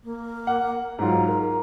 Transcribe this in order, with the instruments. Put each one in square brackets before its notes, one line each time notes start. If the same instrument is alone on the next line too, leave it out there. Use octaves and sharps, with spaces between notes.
[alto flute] A#3
[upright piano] F#5
[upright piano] G#2 F#3 F4 [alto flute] A#5
[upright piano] A#4